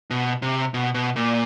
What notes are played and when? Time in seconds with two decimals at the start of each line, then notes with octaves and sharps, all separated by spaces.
0.10 B2
0.42 C3
0.74 B2
0.94 B2
1.16 A#2